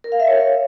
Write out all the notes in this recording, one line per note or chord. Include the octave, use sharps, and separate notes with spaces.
A#4
F5
E5
C#5